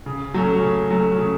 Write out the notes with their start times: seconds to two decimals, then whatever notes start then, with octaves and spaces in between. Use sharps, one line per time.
0.06 C#3
0.34 F#3 A3 C#4
0.63 C#3
0.91 F#3 A3 C#4
1.19 C#3